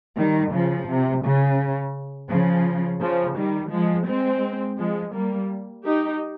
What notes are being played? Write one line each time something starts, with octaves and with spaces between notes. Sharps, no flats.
D#3 G3
C#3 F3
C3
C#3
C#3 F3
C#3 F3
D#3 G3
F3 G#3
G#3 C4
F3 G#3
G3 A#3
D#4 G4